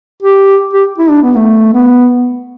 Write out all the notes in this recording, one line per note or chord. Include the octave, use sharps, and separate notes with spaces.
G4
G4
E4
D4
B3
A3
B3